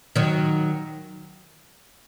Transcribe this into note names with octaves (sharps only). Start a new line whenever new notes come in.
D#3 F#3